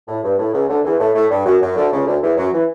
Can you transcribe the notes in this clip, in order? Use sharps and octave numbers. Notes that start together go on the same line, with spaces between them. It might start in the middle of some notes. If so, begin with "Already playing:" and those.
A2
G2
A2
C#2 C#3
D2 D3
E2 E3
A2 A3
A2 A3
G2 G3
F#2 F#3
F#2 F#3
D2 D3
C#2 C#3
D2 D3
E2 E3
F#2 F#3
E3